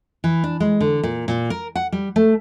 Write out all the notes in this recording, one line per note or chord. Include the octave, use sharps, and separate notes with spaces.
E3
D4
G#3
D3
A#2
A#2
A#4
F#5
G3
A3